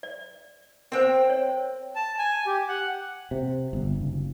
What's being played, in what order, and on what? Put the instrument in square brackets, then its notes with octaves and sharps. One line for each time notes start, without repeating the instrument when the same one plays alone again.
[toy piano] D5
[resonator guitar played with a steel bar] C4 G5 [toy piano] A#4 C5
[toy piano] C#5
[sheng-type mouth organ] A5
G#5
G4
F#5
[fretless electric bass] C3
G1
F#1